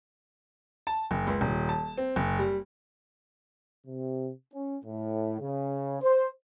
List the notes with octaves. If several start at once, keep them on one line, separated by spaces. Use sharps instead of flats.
A5
F#1
C#2
D#1
A5
C4
F#1
G3
C3
C#4
A2
C#3
C5